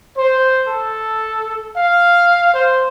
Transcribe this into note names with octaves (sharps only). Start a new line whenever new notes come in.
C5
A4
F5
C5